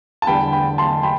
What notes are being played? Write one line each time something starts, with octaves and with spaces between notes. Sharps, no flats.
A5
E2 D3 G3 B3 G5 B5
G5 B5
A5 C6
G5 B5